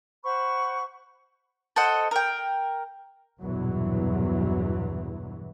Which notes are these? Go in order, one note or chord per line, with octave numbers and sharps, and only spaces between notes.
C5 F#5 B5 C#6
A4 C5 D#5 F#5
A#4 G5
A#1 E2 G2 B2 E3 F#3